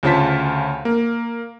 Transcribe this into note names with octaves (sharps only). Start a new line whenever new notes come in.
D2 C#3 F4 C5 A5 B6
A#3